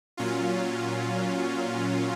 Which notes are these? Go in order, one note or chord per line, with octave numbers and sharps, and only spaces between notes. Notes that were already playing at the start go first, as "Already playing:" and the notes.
A#2 F#3 C#4 F4